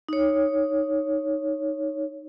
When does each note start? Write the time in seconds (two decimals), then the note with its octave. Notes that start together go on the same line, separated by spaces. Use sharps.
0.09 D#4 C#5